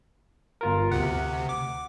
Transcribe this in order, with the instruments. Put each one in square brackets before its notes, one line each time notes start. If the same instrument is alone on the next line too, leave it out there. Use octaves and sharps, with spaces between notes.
[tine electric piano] G1 F4 A#4
[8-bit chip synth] D2 C3 [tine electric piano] F#5
[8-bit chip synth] D6